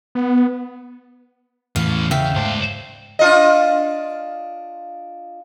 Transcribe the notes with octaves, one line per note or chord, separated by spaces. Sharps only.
B3
E2 A2 E3 F5
C#3 E5 F5 G5
C#2 G#2 A3 C5
D4 F4 D#5